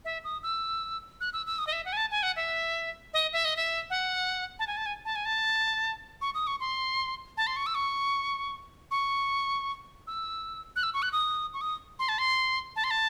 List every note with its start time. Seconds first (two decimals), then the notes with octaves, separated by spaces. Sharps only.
0.05 E5
0.24 D#6
0.43 E6
1.21 F#6
1.33 E6
1.46 E6
1.58 D#6
1.67 D#5
1.72 E5
1.85 F#5
1.93 G#5
1.97 A5
2.11 G#5
2.23 F#5
2.36 E5
3.14 D#5
3.33 E5
3.45 D#5
3.56 E5
3.90 F#5
4.59 A5
4.67 G#5
4.77 A5
4.86 G#5
5.05 A5
5.16 G#5
5.25 A5
6.21 C#6
6.35 D#6
6.47 C#6
6.60 C6
7.37 A5
7.47 C6
7.56 C#6
7.66 E6
7.75 C#6
8.91 C#6
10.07 E6
10.76 F#6
10.83 E6
10.94 C#6
11.02 F#6
11.13 D#6
11.54 C#6
11.61 D#6
11.99 C6
12.09 A5
12.19 C6
12.76 A5
12.84 C6
12.91 A5